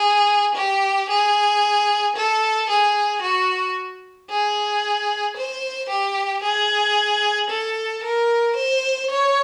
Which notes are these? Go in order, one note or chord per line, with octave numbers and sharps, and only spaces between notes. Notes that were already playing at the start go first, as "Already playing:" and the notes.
Already playing: G#4
G4
G#4
A4
G#4
F#4
G#4
C5
G4
G#4
A4
A#4
C5
C#5